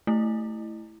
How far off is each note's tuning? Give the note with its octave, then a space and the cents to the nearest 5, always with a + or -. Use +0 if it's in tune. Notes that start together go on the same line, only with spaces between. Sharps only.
A3 +0 E4 +0